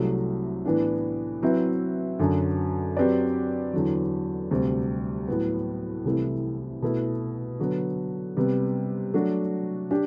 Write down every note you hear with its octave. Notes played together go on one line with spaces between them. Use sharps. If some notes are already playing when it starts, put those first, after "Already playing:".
Already playing: C2 C3 F#3 A3
A2 E3 B3 D4
F#3 C4 E4 B4 E5
F#2 D3 F#3
F#3 C4 G4 B4 D5
E2 D3 F#3
D2 C3 G3
A2 F#3 B3
C2 C3 E3 A3 E4
B2 A3 E4
D3 F#3 B3
C3 G3 B3
F#3 A3 D4 F#4
D4 G4